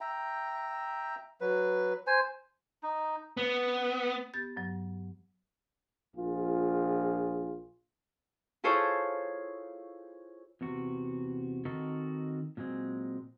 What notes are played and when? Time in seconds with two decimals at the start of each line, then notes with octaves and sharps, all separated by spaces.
0.01 E5 G5 A#5
1.41 F#3 B4
2.07 C5 G#5
2.83 D#4
3.37 B3
4.34 B3 G4 G6 A6
4.56 G2 F#3
6.16 A#1 F4 G#4
8.64 E4 F4 G#4 A4 C5 C#5
10.61 E2 C3 F#4
11.65 D#3 C4 D#4 F#4 A4 A#4
12.57 A#2 F#3 G#3 C4